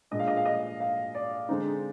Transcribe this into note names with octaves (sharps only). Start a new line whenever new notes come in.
A#2 G#3 D4 D#5
F5
D#5
F5
D#5
F5
D5
D3 G#3 C4 D#4